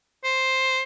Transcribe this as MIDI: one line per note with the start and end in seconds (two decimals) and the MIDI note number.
0.24 0.82 72